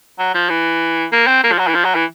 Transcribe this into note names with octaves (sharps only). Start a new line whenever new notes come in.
F#3
F3
E3
A#3
C4
A#3
F3
F#3
E3
F3
F#3
E3